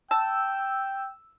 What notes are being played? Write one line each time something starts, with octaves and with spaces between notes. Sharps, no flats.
G5 A5 E6